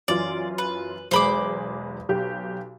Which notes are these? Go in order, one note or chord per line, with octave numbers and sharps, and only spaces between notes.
F#2 E3 F4 D5
B4
B1 E2 G#3 C5 B5 D6
B1 G4